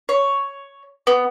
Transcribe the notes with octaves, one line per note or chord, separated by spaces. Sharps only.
C#5
B3